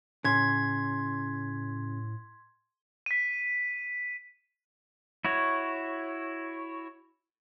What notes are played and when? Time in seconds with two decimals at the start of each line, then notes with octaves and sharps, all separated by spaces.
0.24 A2 C#3 C6 G#6 B6
3.06 B6 D#7
5.25 E4 F#4 C#5